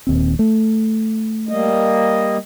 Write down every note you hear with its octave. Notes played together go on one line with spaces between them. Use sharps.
D#1 D#2 C4
A3
G3 A#3 D#5